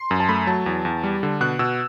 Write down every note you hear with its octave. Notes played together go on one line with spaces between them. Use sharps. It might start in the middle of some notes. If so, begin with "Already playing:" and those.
Already playing: C6
F#2
A5
A3 B5
F#3 A5
E2
E2
G3
D3
B2 F#6
B2 E6